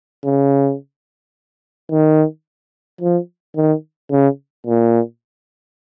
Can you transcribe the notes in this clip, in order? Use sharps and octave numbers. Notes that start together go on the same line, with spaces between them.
C#3
D#3
F3
D#3
C#3
A#2